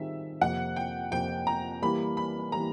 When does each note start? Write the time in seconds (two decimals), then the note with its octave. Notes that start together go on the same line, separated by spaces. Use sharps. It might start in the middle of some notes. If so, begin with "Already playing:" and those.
Already playing: D#3 G3 C4 F4 G#4 E5
0.41 F2 C3 F3 A#3 F#5
0.76 G5
1.12 F2 C3 F3 A#3 G5
1.47 A#5
1.82 E3 G3 A#3 B5
2.17 B5
2.52 E3 G3 A#3 A#5